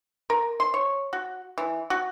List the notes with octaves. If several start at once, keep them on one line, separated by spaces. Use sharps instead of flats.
A#4
C6
C#5
F#4
E3
F#4